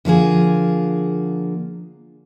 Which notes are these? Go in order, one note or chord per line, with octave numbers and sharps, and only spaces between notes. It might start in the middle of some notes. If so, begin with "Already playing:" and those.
D3 F3 A#3 G#4